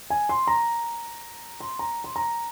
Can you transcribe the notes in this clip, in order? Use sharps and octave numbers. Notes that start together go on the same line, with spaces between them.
G#5
C6
A#5
C6
A#5
C6
A#5